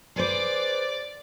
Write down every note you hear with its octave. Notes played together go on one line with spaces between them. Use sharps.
G#4 B4 C5 D5 D6